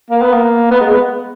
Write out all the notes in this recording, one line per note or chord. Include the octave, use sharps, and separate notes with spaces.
A#3
B3
A#3
B3
G#3
B3